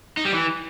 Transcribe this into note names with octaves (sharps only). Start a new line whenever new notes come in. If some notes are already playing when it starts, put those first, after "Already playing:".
D#4
G3
E3